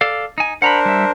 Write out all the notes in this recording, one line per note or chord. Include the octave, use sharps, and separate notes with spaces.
A4 D5 F5
D#4 G#5
D4 A#4 C5 F#5 A#5 B5
G3 E5